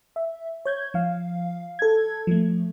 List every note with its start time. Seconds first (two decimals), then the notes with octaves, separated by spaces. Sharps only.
0.16 E5
0.65 C#5 G6 G#6
0.94 F3 F5
1.79 A4 G#6
2.27 F3 A3